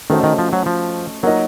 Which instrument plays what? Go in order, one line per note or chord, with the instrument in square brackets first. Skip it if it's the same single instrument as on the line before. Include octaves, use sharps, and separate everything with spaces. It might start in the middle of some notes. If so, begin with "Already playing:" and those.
[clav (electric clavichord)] D#3 [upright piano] A3 C#4 F#4 C5 D#5
[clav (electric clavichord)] D#3
F3
F#3
F3
[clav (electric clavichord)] F#3 [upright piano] A#3 D#4 A#4 D#5